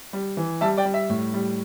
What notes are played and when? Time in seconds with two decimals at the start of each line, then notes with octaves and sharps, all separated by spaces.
0.13 G3
0.37 E3
0.61 G3 E5 A5
0.77 D5 G5
0.85 G3
0.94 E5
1.10 A2
1.34 G3